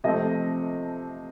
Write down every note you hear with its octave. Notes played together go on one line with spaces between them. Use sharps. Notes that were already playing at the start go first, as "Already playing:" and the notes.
C3 F3 A3 C4 D#5